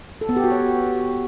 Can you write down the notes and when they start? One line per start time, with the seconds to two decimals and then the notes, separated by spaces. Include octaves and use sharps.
0.21 A4
0.29 B3
0.36 G4
0.44 F#4
0.51 C#5